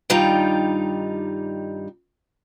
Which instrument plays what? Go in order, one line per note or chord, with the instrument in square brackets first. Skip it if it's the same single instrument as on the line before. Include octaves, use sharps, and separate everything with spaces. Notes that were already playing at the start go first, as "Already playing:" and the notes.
[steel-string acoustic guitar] G2 D#3 G3 D#4 F4 G5